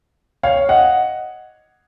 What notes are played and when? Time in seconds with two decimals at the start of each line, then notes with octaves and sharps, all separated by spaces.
0.43 C#5 F5
0.69 D#5 F#5